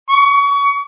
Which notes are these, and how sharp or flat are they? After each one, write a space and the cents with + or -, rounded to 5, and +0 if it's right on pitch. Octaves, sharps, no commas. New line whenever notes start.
C#6 +30